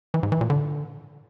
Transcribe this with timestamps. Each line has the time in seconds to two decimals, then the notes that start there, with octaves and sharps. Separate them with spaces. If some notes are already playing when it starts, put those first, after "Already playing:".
0.14 E3
0.23 G#2
0.32 E3
0.41 A#2
0.50 D3